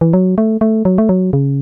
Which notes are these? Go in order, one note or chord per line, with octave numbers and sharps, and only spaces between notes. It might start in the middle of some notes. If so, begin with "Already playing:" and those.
E3
F#3
A3
A3
F#3
A3
F#3
C#3